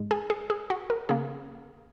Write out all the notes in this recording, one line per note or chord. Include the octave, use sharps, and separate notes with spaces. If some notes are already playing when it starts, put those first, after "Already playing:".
Already playing: G#2 G#3
G#4
G#4
G#4
F#4
A#4
C#3 A#3 G#4